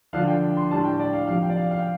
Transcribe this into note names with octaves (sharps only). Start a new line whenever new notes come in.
D3 F3 D4 F5
G5
C6
A2 G3 D4 A5
G5
D5
F5
F2 C3 F3 F5
G5
D5
F5
F5
G5